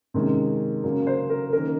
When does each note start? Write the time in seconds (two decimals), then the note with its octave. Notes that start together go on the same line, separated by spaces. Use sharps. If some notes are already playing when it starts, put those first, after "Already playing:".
0.14 C3 D#3 G#3 C#4
0.83 C#3 F#3 A#3 C#4
1.07 C5
1.30 A#4
1.53 D#3 A#3 C#4 A#4